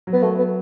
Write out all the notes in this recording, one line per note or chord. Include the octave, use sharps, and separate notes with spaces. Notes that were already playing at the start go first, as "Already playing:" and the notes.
F#3
B3
A3
B3